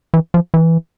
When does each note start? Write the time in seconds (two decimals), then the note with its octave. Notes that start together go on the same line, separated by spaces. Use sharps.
0.14 E3
0.34 F3
0.54 E3